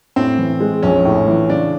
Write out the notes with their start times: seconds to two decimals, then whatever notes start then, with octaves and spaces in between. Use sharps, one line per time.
0.16 A2 C4
0.38 E3
0.60 G#3
0.83 A#1 C#4
1.05 A2
1.27 E3
1.50 C#3 D4